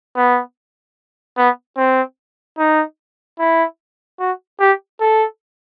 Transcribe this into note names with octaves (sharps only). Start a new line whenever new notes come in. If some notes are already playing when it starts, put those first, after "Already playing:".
B3
B3
C4
D#4
E4
F#4
G4
A4